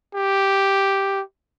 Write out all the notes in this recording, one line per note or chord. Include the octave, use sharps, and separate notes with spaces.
G4